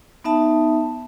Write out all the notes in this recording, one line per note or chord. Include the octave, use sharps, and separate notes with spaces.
B3 D#4 E5 A5